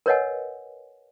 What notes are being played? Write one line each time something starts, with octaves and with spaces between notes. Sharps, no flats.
A#4 B4 C#5 D#5 F#5 G#5